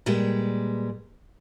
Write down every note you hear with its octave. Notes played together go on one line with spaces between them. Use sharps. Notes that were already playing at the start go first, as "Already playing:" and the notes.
A#2 G3 G#3 B4